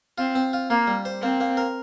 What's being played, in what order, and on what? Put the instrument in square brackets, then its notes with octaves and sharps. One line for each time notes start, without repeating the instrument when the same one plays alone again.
[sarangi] C4 [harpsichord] F4
[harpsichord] C4
F4
[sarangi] A#3 [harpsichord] F4
[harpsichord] G3
C5
[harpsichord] A#3 [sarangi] C4
[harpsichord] A#3
A#4